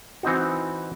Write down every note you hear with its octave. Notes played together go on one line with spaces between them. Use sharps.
E3 C4 D#4 F#4